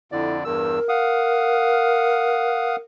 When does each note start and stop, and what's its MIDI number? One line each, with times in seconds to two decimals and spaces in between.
0.12 0.44 41
0.12 0.44 50
0.12 0.38 64
0.12 0.44 74
0.45 0.79 40
0.45 0.79 43
0.45 2.77 70
0.45 0.79 88
0.89 2.76 77
0.89 2.76 78
0.89 2.76 87